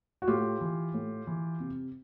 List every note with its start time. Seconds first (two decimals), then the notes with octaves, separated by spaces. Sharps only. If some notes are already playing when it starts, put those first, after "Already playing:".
0.22 F#4
0.27 A2 F4 G4
0.61 E3
0.94 A2
1.27 E3
1.60 C3